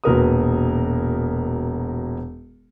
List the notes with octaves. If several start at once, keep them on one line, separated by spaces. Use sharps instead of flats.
E1 A#2 F#4 A#4 B4 D#6